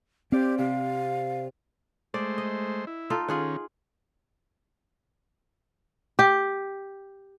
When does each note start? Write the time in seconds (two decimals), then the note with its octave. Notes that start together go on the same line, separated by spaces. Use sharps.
0.32 C4 G4 C5 D5 F5
0.58 C3 F5
2.14 G#3 A3 C5 D5
2.38 D#5
2.87 E4
3.10 D#4 F4 A4
3.29 D#3 C#4 F4 G#4 F#5
6.19 G4